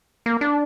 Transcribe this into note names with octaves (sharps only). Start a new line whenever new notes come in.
A#3
D4